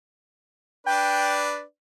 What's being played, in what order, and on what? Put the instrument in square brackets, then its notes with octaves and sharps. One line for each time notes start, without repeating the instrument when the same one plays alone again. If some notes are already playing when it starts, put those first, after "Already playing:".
[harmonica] D4 B4 D5 [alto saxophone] G5